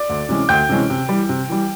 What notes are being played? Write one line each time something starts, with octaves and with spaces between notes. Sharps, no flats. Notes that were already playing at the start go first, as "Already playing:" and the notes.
Already playing: D5 D6
D2
C3 E3 G#3 C#4
D2 G5 G6
C3 E3 G#3 C#4
C3
E3 G3
C3
E3 G3